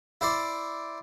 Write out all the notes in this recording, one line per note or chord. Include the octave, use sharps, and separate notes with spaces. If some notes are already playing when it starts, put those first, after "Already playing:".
E4 C5 D5